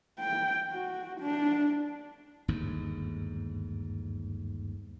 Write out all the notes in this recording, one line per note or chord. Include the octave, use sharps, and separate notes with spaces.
G5
F#4
D4
G1 D#2 G#2